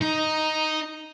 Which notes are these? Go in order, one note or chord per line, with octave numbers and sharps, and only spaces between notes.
D#4